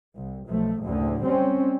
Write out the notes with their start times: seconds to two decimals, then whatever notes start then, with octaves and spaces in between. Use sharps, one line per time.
0.16 C2
0.47 B1 F3 A3
0.82 F#1 D2 A2 D3
1.23 G3 C4 C#4